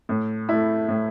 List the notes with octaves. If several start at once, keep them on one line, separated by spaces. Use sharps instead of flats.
A2
A3 E4
A2